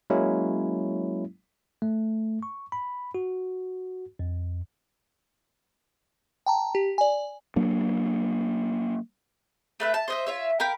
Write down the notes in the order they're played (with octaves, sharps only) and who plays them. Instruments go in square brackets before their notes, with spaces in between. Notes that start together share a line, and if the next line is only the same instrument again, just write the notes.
[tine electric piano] F#3 G#3 A#3 C#4 E4
A3
C#6
B5
F#4
F2
[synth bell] G5 A5 A#5
G4
D5 G#5
[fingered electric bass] F#3 A#3 D4
[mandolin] A3 B4 E5
A5
C5 D#5 E5
F4 C#5 E5
A#4 F5 G5 B5